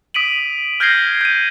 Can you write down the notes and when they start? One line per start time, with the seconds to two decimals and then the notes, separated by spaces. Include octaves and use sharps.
0.14 D#6 B6 D7 D#7 F#7
0.80 F6 G6 G#6 A#6 C7 G7
1.21 G6 D#7